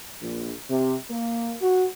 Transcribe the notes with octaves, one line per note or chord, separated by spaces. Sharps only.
A#1
C3
A#3
F#4